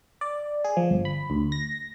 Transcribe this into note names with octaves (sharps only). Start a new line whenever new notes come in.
D5
G#4
F3
G1
B5
D2
A#6